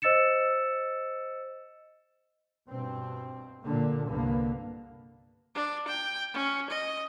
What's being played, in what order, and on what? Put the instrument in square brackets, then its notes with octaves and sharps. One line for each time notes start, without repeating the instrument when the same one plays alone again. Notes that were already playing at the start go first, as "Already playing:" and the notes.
[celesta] C5 D#5 E6 A6 C#7 E7
[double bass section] G2 B2 C4
A#2 D3 A#3
C2 G2 D3 A#3 B3
[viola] D4
G5
C#4
D#5